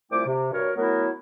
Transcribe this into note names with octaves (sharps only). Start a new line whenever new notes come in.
C2 A3 E4 F4 G5 D6
C3
G2 F#4 A#4 C#5
F#3 A3 B3 E4 A#4